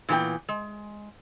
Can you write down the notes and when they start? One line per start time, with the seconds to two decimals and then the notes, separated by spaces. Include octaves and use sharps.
0.09 A#2 E3 B3 A4 G5
0.49 G#3